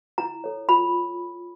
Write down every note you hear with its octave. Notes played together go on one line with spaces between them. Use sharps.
E4 A#5
A4 C#5
F4 B5